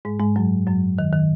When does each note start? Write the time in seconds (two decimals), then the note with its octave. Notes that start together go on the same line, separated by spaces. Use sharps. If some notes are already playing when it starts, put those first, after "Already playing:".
0.05 G#2 G#3
0.19 G#2 G#3
0.36 F#2 F#3
0.67 F#2 F#3
0.99 D#3
1.13 D#3